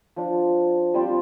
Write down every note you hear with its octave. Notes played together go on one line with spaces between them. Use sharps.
F3 D4 F4
G3 C4 F4 D5